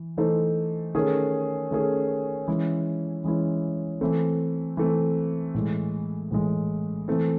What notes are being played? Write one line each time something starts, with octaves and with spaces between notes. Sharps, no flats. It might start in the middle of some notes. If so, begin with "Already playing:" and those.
Already playing: E3
E3 A3 D#4 A4 C5
D#3 A3 C#4 G#4
D#3 A3 C#4 G#4
E3 G#3 C#4 E4
E3 G#3 C#4 E4
E3 A3 C4
E3 A3 C4
A2 E3 G#3
A2 E3 G#3
E3 A3 C4